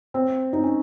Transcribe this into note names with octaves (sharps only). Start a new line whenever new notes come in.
C4
D#4
C#4